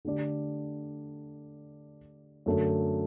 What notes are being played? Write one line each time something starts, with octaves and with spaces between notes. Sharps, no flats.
D3 A3 D4 G4 D5
F#2 D3 A3